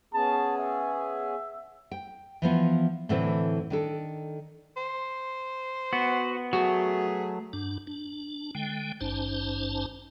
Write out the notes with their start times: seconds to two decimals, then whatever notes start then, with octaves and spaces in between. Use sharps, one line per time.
0.14 B3 C#4 G#4 A5
0.58 E5
1.91 G5
2.42 E3 F3 B3
3.09 A2 D3 E3 A3 C4 E4
3.70 D#3 D4 A4
4.77 C5
5.93 B3 F#4
6.53 F#3 A3 F#4 G#4
7.53 G2 D4
7.87 D4
8.55 D3 G#3 G5
9.01 G#1 G2 C#4 D#4 C5 A5